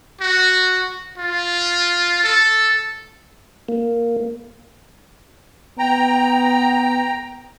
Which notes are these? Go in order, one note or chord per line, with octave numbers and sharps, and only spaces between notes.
F#4
F4
A4
A#3
B3 G5 A#5